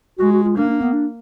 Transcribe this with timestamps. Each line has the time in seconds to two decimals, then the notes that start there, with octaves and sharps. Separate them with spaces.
0.19 G#3 F#4
0.32 F#4
0.44 F4
0.57 A#3 D4
0.69 D4
0.81 B3
0.93 D4